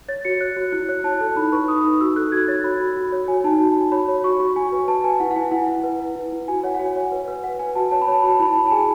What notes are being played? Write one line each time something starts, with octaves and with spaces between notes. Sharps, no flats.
C#5 A6
F#4 C#7
C#5 F#6
F#4
E4 F#6
C#5 F#6
E4 A5
A4
D#4 B5
B4 C#6
D#4 D#6
D#4
F#4 E6
A4 F#6
F#4 G#6
C#5 A6
F#4 B5
F#4
F#4
C#5
F#4 G#5
D#4 A5
F#4
F#4
C#5 B5
C#5
F#4 C#6
F#4
F#4 G#5
B4
B4 A5
B4 G#5
E4 F#5
F#5
E4 G#5
E4 F#5
E4
B4
B4
E4
E4
F#4 G#5
C#5 F#5
F#5
F#4 G#5
C#5
B4
B4
B4 F#5
B4 G#5
F#4 A5
C#5 A5
B5
C#5 A5
F#4 B5
A5
E4 B5
E4 A5
A5
G#4 G#5